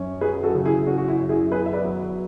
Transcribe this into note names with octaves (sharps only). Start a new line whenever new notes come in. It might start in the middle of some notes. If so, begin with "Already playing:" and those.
Already playing: F#2 C#4
F#3 G#4 B4
F#4 A4
C#3
E4 G#4
C#4 F#4
F#4
E4
F#2
E4 G#4
B3 G#4 B4
E5
B4 D5
F#3